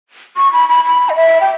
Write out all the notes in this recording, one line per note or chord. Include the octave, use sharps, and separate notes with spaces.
C#6
B5
B5
B5
D#5
E5
G5